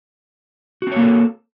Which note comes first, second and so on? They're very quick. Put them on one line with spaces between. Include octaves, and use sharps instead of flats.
F#4 C4 C#5 A#3 A4